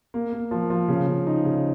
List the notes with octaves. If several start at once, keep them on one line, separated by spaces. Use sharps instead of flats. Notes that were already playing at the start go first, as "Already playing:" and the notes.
A#3
A#3
F3
F3
C#3
C#3
D#4
C#3